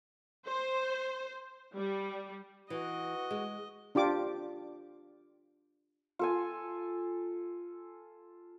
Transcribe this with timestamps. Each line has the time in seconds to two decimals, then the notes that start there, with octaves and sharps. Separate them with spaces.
0.48 C5
1.75 G3
2.70 E3 F#4 D#5
3.31 G#3
3.95 D4 F4 G4 D6
6.19 F4 A4 G#5